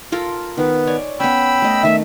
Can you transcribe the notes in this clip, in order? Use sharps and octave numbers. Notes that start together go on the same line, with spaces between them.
F4 A4 A#4
D#3 B3
C#5 D5 G#5
B3 C#4 G5 B5 E6
A3 D#5
D#3 A3 E5